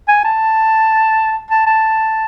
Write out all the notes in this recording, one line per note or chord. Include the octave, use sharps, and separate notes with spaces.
G#5
A5
A5
A5